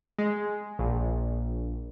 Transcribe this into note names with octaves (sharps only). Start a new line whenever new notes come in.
G#3
A#1